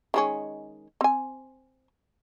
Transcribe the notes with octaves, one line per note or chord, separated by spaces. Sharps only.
D#3 G#3 C#4
C4 G#5